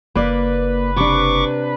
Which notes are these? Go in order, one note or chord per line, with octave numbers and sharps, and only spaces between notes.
F#1 A#3 B4 D5
C3 D4 C#6 D6